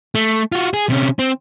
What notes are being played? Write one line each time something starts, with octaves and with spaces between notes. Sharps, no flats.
A3
F4 F#4
G#4
C3 C#4
C4